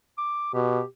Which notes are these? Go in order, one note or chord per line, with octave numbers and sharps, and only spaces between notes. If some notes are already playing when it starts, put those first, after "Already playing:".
D6
B2 G4